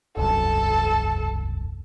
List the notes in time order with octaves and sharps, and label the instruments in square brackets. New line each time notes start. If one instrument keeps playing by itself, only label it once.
[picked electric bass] E1 C2 F#2 [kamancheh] A4 A5